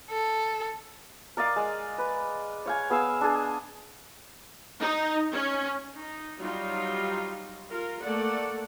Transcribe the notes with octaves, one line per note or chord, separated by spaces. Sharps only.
A4
A#4 D5 D#5 F5
G#3
B4
C#5 F5 G#5
B3 G#4 F5 E6
D4 G#4
D#4
C#4
D#4
F#3 G3 D#4 F4
F4 A#4
A3 A#3 A4 D5 F#5